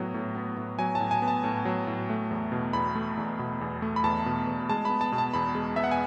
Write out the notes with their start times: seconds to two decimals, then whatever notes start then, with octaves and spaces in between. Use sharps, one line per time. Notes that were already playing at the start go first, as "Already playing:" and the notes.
Already playing: A2 F#3 B3
0.14 A2
0.35 B3
0.57 A2
0.79 F#3 G#5
0.95 A5
1.00 A2
1.11 G#5
1.22 B3
1.28 A5
1.44 A2
1.65 F#3
1.87 A2
2.10 A3
2.31 E2
2.52 B2
2.73 E2 B5
2.95 A3
3.17 E2
3.39 B2
3.61 E2
3.82 A3
3.96 B5
4.04 E2 A5
4.26 B2
4.47 E2
4.69 G#3 A5
4.85 B3 B5
5.01 A5
5.12 B2
5.18 A5
5.34 E2 B5
5.55 G#3
5.76 B3 E5
5.84 F#5
5.91 G#5